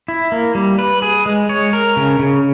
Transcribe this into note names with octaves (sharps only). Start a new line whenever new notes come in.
E4
A#3
G3
B4
G#4
G#3
C#5
A#4
C#3
C#3